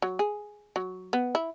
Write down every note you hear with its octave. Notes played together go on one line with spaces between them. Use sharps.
F#3
G#4
F#3
B3
E4